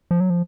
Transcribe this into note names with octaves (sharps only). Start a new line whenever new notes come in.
F3
F#3
F3